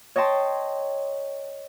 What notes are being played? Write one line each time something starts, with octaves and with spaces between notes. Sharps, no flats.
C#5 D#5 G5 A5 C6